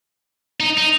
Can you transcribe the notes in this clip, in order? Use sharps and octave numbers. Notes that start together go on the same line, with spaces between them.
D#4
D#4